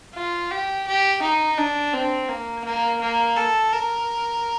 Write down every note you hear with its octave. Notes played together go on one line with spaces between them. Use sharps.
F4
G4
G4
D#4
D4
C4
A#3
A#3
A#3
A4
A#4